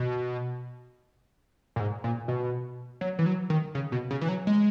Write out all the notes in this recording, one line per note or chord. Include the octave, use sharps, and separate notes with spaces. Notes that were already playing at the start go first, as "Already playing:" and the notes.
Already playing: B2
A#2
G#2
A#2
B2
F#3
E3
F#3
D#3
C#3
B2
C#3
E3
F#3
G#3